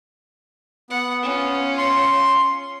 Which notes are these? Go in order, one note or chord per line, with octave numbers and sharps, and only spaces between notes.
B3 F#5
C#4 F4
C6